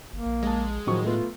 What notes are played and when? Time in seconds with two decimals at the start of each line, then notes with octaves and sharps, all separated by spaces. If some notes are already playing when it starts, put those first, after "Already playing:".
0.13 G1 A#3
0.26 A#1
0.43 G#3 G#4 A5
0.87 A2 D#3 F3 F#3 C#6
1.05 A3 B3 F4